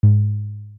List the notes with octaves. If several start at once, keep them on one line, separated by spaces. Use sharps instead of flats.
G#2